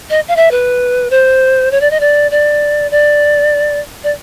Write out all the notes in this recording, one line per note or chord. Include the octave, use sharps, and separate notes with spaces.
D#5
F5
E5
B4
C5
C#5
D5
D#5
D5
D5
D5
D5